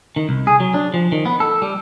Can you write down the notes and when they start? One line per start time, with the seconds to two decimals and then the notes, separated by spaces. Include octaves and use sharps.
0.16 D#3
0.29 C2
0.47 G#4
0.60 F#3
0.74 D4
0.94 F3
1.12 D#3
1.26 B3
1.40 A4
1.62 G3